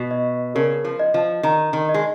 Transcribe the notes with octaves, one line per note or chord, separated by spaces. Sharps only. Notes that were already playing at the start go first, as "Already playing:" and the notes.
Already playing: B2
D#5
C#3 A#4
F3
D#5
F3
D#3 A#5
D#3
D#5
G#3